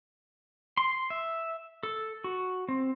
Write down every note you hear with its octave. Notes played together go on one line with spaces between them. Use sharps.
C6
E5
A4
F#4
C4